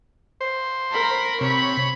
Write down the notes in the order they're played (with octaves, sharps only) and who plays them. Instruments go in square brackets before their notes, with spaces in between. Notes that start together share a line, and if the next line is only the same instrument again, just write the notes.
[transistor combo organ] C5
[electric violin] A#4 B5
[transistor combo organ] C3 [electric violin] C#5 B5